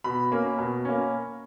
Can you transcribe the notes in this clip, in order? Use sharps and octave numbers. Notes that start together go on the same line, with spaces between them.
B2 B5
A#3 C#4
B2
A#3 C#4